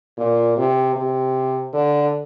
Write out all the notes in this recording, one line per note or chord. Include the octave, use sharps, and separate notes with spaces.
A#2
C3
C3
D3